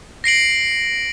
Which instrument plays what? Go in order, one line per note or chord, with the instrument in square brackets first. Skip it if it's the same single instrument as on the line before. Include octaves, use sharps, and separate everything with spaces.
[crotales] A#6 C7 D7 F#7